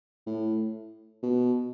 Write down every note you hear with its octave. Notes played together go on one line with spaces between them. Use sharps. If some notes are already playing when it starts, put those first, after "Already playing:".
A2
B2